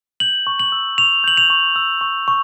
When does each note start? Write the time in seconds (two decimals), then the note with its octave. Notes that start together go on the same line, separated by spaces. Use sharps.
0.20 G6 F#7
0.47 C#6
0.59 F#7
0.72 E6
0.98 C#6 F7
1.24 G6 F#7
1.37 F7
1.50 C#6
1.76 E6
2.01 C#6
2.28 C#6